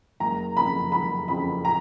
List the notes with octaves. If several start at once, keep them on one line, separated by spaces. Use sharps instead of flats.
F#1 A#5
F2 C#3 B5
F#1 B5
F2 C#3 B5
A#5